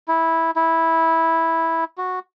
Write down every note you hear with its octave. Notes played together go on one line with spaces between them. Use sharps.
E4
E4
F#4